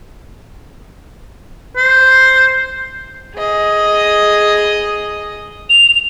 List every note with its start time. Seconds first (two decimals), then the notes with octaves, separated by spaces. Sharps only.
1.77 C5
3.36 G#4 D#5
5.69 F7